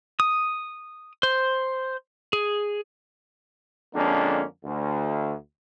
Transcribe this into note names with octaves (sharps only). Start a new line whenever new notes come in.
D#6
C5
G#4
F2 D3 G#3 A#3 C#4 D4
D2